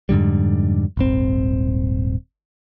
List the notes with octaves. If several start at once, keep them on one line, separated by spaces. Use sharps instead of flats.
F2 G#2 D3 G3
D#1 G#1 C4